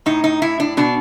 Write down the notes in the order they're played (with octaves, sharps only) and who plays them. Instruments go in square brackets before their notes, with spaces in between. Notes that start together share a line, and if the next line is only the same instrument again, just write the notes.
[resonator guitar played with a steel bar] A2 D#4
D#4
A2 E4
D4
B2 D4